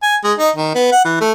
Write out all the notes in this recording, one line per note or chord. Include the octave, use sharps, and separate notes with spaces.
G#5
G#3
D#4
D#3
B3
F#5
E3
A3